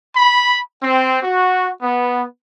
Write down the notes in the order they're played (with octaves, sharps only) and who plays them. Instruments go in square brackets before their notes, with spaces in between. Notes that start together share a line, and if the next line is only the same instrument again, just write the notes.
[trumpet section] B5
C4
F#4
B3